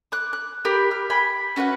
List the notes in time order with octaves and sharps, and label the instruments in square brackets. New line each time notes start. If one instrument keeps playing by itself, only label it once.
[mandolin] D6 F#6
F#6
G4 A#4 B5
F6
G5 G#5 B5
C#4 F#4 B4 F#5